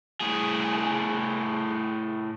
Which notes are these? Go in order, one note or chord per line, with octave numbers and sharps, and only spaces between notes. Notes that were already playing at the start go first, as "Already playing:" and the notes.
A2 G#4